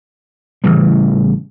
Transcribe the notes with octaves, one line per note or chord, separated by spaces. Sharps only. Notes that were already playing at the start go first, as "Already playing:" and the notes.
A1 C#3 E3 G3